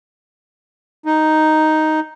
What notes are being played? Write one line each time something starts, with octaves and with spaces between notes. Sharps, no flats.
D#4